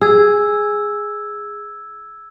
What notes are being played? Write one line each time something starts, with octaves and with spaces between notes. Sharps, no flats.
G#4 E6 G#6